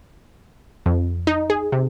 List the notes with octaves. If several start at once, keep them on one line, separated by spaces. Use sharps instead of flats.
F2
D#4
G#4
C3